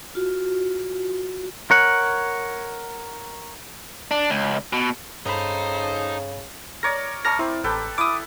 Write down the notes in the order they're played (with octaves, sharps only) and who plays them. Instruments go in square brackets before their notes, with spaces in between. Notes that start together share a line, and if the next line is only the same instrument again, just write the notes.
[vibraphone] F4 F#4
[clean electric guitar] A#4 C#5 F#5
[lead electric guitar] D4
C#2
B2
[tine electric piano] G2 B5 [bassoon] C#3 [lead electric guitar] D#4 [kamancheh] A4 C5
[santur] A#4 C#5 D5 [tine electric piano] A#6
[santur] A#4 D5 C#6 [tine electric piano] A5 F6 A#6
[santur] C4 [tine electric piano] E4
[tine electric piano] A1 [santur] A4 B4 G5
[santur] E4 [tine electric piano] D6 D#6